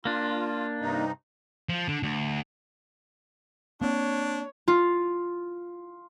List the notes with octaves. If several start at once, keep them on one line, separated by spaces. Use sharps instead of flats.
A#3 D4 F4
G2 C3 D#4
F3
D3
D2
A#3 C4 D4 C#5
F4